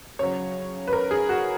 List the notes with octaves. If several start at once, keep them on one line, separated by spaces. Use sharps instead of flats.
C#3 F#3 C#5
B4
A#4
G#4
F#4